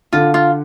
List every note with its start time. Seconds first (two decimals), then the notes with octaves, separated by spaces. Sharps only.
0.13 D3 F4
0.34 F4